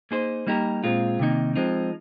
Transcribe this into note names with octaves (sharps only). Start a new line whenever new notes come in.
A#3 D#4 G#4 C5
G3 A#3 D#4 G4 A#4
A#2 G#3 C4 F4
C3 D#3 A#3 D#4
F3 G#3 C4 D#4